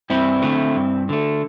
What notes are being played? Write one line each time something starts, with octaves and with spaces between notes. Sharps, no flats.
G2 C4 E4
D3 A3
G2
D3 A3